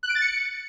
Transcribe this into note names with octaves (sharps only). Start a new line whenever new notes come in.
F#6
D7
A6
C#7